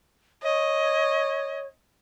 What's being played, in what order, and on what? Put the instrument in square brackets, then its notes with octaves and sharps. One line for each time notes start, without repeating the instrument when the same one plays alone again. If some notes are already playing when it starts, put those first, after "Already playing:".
[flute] C#5 [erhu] D#5